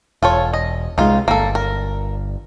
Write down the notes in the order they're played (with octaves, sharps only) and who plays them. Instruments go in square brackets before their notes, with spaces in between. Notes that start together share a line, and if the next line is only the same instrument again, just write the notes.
[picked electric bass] E1 [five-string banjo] F4 A4 C#5
[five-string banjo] D#5
[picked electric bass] C2 G#3 [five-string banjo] D#4 F4
[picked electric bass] G1 [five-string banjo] A#3 A4
[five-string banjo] A#4